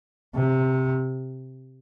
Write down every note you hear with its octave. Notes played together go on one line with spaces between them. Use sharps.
C3